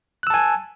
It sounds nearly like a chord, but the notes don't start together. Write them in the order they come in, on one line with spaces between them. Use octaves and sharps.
F#6 E6 A5 G#5